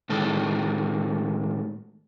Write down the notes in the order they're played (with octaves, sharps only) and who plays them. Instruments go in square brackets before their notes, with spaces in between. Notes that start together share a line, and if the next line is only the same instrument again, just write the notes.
[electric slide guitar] A2 D#3 G#3 A4